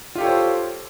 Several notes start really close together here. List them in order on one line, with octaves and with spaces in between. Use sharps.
F4 G4 A4 C#5 C5